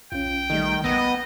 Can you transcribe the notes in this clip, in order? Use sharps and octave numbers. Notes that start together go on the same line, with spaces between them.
B1 C#4 F4 G5
D#3 G3 A3 D#4
A#1 B3 D#5 F#5 E6